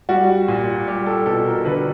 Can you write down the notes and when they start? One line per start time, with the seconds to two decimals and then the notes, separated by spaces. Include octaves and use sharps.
0.09 G3 F#4
0.48 A#2
0.87 G3 G4
1.06 A4
1.26 B2 A4
1.46 A#4
1.65 D3 B4